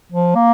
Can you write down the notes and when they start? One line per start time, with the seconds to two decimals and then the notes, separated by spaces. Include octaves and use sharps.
0.12 F3
0.35 A#3